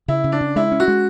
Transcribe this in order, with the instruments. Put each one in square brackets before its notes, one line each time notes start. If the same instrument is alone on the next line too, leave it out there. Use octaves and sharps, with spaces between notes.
[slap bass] C#3 [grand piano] E4
[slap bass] C#3
[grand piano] D4
[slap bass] C#3
[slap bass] G#3 [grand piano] E4
[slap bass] C#4
[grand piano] F#4
[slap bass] G#3